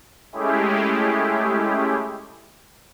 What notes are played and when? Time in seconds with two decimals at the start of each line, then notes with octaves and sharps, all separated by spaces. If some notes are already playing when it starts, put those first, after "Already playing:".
0.32 G#3 A3 C#4 E4 G4 G#4